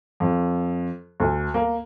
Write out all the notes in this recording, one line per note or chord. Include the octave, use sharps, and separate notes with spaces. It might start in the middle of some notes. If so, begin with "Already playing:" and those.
F2
D2
A#3